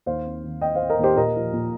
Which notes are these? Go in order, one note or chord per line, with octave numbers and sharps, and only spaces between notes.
D#2 C5 F5
C4
D#3
C4 D#5 G5
C5 F5
C4
A#4 D#5
D#2 G4 C5
A#2 A#4 D#5
F3
A#2